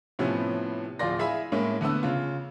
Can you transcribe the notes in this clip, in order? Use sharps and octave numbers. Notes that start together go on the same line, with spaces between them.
A2 C3 F3 B3 C#4
D1 F3 F4 D5 C6 A#6
E4 G#4 E5 F5 G#5 B5
A2 G#3 A#3 C#4 E4
D3 A3 B3 E6
C#3 F4